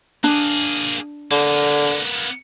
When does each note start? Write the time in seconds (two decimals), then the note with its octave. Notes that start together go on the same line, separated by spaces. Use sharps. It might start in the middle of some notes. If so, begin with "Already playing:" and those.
0.24 A#3 D4 G#4
1.31 D3 A#3 B3